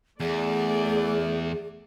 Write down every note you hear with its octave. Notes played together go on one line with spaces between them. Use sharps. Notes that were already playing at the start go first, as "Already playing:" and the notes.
E2 A3 G#4 D5